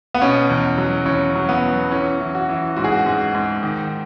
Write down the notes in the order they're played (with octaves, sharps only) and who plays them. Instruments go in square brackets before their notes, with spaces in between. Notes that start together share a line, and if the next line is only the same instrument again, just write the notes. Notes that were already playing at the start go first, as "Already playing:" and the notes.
[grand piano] B3
B2 C#4
E2
F#3
E2 C#4
F#3
B3
F#3
E3 C#4
E3
F#4
E3
G#2 F#4
G#4
F#4
G#2
G#2
D#3